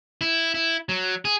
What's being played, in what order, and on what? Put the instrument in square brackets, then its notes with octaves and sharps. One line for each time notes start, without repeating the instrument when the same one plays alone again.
[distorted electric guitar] E4
E4
F#3
G#4